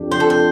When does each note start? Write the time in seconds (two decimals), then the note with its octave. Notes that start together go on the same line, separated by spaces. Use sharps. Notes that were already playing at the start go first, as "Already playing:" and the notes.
Already playing: F2 F3 D4 G4
0.11 C5
0.20 A4
0.30 C5